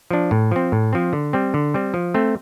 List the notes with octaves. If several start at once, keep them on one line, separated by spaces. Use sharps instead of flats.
F3 D4
A2
F3 C4
A2
F3 C4
D3
G3 C4
D3
G3 C4
F3
A3 C4